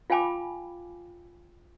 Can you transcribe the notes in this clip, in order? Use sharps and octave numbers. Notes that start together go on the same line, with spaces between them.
F4 F5 G5 G#5 B5 D6